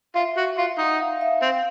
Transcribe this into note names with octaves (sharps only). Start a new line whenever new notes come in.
F4 E5
F#4
F4
D#4 F#5
F5
E5
C4 F5